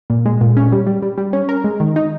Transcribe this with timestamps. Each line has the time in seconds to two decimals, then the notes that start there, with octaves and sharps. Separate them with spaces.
0.10 A#2
0.26 G#3
0.41 A#2
0.57 C#4
0.72 G3
0.87 G3
1.02 G3
1.18 G3
1.33 C#4
1.49 A#4
1.64 G#3
1.80 D#3
1.96 D#4